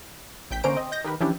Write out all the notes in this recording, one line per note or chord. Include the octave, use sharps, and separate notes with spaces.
A1 G5 G6 B6
D3 A#3 C#4 C5 A#5 D7
C4 D#5
D#5 G6 A#6
D#3 G4 A#4 B4
E3 F3 C#4 D4 E4 G4